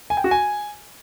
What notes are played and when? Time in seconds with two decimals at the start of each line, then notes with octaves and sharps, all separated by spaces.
0.10 G#5
0.17 G5
0.24 F#4
0.31 G#5